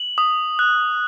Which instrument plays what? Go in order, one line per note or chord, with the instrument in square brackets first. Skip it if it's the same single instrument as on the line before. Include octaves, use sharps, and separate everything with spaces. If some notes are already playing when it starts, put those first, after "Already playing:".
Already playing: [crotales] F#7
D#6
F#6